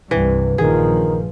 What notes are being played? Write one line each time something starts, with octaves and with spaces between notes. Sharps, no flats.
C2 G2 C3 E3
A#1 D#3 F3 G#4